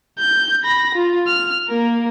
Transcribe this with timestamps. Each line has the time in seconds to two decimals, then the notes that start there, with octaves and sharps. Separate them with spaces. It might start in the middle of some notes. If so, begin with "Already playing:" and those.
0.19 G6
0.64 B5 A#6
0.95 F4
1.27 F6
1.68 A#3 A#4